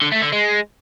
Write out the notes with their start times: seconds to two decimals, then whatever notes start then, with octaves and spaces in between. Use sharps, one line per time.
0.02 D3
0.12 A3
0.22 D3
0.32 G#3